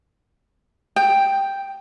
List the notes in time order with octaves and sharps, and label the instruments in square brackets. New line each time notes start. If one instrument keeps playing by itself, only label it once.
[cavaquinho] G5